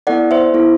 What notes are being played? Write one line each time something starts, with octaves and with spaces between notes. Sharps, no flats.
B3 E4 A4 D5 F#5
C5 E5
B3 E4 A4